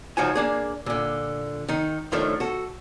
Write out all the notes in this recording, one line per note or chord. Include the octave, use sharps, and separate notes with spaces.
C#2 F3 D#4 F#4 G#5
A#3 D4 G#4
A#2 D3
D#3 D#4
F#2 A2 D#3 F3 A3 D4
F#4 A4